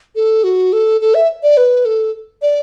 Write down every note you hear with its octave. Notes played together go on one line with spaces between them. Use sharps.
A4
F#4
A4
A4
E5
D5
B4
A4
D5